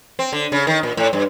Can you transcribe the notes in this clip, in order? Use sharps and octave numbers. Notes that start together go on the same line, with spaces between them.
C4
D3
C#3
D#3
A#2
A2
G2